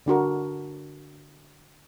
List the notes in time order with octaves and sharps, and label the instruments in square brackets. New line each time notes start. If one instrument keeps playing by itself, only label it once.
[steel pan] D3 D4 F#4 A#4